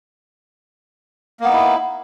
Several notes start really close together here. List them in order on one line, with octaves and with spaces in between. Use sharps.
A#3 B3 D#4 E4